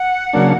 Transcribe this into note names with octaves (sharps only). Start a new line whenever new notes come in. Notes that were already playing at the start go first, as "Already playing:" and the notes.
Already playing: F#5
C#3 F#3 A#3 D4